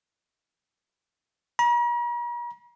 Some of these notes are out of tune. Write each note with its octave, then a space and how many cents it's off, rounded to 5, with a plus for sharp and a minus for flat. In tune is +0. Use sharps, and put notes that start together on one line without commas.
A#5 +45